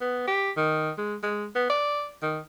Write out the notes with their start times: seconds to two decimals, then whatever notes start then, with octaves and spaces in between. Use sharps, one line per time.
0.01 B3
0.27 G4
0.57 D#3
0.98 G#3
1.23 G#3
1.55 B3
1.70 D5
2.22 D#3